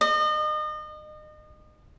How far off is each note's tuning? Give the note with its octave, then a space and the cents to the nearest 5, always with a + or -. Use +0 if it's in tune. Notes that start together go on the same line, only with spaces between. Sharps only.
D#5 -35